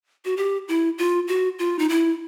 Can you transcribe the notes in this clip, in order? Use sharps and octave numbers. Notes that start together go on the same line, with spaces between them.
F#4
G4
E4
F4
F#4
F4
D#4
E4